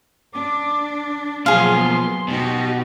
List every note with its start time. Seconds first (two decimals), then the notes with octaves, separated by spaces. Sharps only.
0.33 D4 D6
1.46 B2 F3 F#3 A#3 B3 G#4 F5 C6
2.28 B2 D#4 F#4 G4